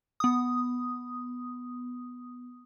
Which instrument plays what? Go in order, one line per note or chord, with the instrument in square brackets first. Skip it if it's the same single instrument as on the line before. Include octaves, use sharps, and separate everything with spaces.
[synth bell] B3 D#6